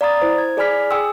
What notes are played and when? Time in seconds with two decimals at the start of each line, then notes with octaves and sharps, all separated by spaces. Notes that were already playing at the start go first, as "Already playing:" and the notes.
0.01 D5 F5 A#5 B5 D#6 A6
0.22 E4 C5
0.38 G#6
0.57 G#4 D5 G#5 B5 F6 B6
0.91 G#4 G5 G#5 C6 D#6 E6